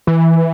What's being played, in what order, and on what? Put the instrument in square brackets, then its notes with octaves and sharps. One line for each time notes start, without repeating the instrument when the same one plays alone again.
[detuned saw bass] E3